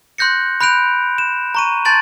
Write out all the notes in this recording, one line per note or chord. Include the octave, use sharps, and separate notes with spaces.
C6 F#6 G6 A#6 C#7
B5 F#6 G6 D7 F7
E7
A#5 C#6 D#7
A5 C6 G6 A6 D7 F#7